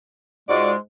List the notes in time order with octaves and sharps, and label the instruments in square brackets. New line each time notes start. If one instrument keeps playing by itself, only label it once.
[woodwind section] G#2 G#3 [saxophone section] F4 F#4 D5